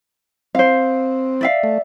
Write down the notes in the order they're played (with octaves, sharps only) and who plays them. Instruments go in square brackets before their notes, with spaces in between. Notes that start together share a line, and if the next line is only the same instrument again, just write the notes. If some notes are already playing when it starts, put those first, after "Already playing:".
[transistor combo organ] C4 [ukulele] C5 F5
[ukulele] D5 E5 F5
[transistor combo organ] A3